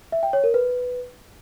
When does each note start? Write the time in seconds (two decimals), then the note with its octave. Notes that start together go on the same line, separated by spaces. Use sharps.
0.12 E5
0.23 G5
0.33 C#5
0.44 A#4
0.54 B4